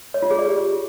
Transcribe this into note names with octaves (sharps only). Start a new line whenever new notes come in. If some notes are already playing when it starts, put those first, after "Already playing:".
C#5
F4
G#4
D5
G4